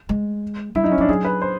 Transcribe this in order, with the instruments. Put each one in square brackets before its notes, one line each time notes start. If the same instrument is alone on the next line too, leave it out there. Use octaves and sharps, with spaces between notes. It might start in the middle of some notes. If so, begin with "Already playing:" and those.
[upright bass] G#3
[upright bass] G3 [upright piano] E4
[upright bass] F#3 [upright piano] D#4
[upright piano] C#4
[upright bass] F#3
[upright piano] D4
[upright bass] F#3 [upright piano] G#4
[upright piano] B4
C5